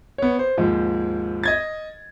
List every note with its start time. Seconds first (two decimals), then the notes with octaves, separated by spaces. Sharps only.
0.18 B3 C#5
0.39 C5
0.58 D#2 G#2 F3
1.43 D#5 G#6 A6